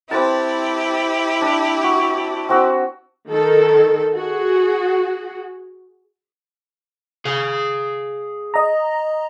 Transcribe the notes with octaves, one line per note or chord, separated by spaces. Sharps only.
C4 E4 G4 B4 A5
D4
F#4
C4 F#4 E6
D#3 A4
F#4 G#4
G#4 F5
D#5 A#5